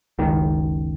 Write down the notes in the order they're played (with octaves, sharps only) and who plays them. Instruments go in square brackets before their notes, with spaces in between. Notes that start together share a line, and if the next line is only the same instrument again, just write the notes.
[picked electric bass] F#1 C#2 D#3